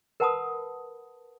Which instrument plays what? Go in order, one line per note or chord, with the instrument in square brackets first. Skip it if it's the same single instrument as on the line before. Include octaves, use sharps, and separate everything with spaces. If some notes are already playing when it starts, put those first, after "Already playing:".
[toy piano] A#4 B4 F#5 A5 B5 D#6